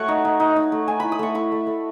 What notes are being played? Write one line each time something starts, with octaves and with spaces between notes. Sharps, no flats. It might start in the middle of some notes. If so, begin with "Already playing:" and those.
Already playing: A3 F#4 C#5 F#5 C#6
D#4
D#4
D#4
D#4
A3
A3 G#5
E4 B5
D#6
A3 C#6
E4 C#6
A3
A3